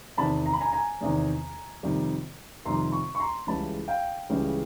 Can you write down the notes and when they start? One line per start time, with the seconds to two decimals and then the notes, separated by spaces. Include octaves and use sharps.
0.18 E2 C3 D#3 A5 B5
0.46 A#5
0.53 B5
0.60 G#5 A#5
0.72 G#5 A#5
1.01 E2 C3 D#3
1.83 F2 C3 D#3 G3
2.65 F2 C3 D#3 G3 A#5 C6
2.92 B5 C#6
3.15 C#6
3.20 A#5 C6
3.47 C#2 C#3 E3 G3 A5 B5
3.88 F5 G5
4.29 C#2 C#3 E3 G3